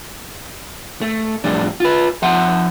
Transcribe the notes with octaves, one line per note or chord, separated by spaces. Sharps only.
A3
F2 A2 G3 D4
F4 B4
F3 E5 F#5 C6